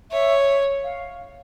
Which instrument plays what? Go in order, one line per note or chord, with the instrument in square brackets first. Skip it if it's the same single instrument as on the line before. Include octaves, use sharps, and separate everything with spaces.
[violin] C#5 [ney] E5
[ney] F5